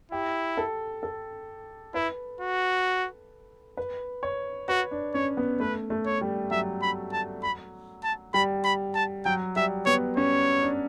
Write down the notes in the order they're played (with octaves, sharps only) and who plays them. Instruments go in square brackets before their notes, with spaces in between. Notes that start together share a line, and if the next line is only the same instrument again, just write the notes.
[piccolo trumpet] E4 [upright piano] G4
[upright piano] A4
A4
[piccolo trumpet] E4 [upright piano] B4
[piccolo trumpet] F#4
[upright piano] B4
C#5
[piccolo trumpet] F#4 [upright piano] B4
[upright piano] D4
[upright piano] C#4 [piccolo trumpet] C#5
[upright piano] B3
[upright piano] A3 [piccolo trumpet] B4
[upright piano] A3
[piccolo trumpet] C#5
[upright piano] G3
[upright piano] F#3 [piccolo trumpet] E5
[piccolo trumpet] B5
A5
B5
A5
[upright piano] G3 [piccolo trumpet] B5
[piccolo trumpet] B5
A5
[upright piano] F#3 [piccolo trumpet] G5
[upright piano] G3 [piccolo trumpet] E5
[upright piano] B3 [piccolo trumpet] C#5
[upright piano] C#4 [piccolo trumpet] C#5
[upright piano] D4